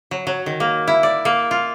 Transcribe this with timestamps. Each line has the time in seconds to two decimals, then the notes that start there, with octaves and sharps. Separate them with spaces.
0.11 F#3
0.27 F#3
0.46 D#3
0.60 A#3
0.88 E4
1.03 D5
1.25 A#3
1.51 F4